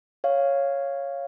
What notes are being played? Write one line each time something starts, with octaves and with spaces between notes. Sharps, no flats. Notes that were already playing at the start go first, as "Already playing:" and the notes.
C#5 F5